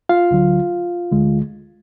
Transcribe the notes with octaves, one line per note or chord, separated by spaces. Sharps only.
F4 F5
D2 D3 F#3
D2 D3 G#3